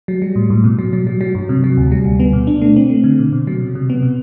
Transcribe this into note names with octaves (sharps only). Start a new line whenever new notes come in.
F#3
G3
A2
A2
B2
F#3
F#3
F#3
F#3
G2
C3
F#3
D2
G3
D2
B3
B2
D4
A3
C4
A3
D3
B2
B2
F#3
C3
C3
B3
B2